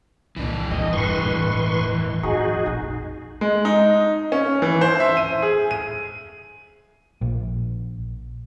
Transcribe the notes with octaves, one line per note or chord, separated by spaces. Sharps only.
C2 F2 A#2 E3 D4
E2 D#5
G2 B4 C6 C#6
E1 E2 A2
F2 D#4 F#4 G#4
A#1
G#3
D#4
C#4
E3
C5
E5
D#7
G#4
D#7
A#1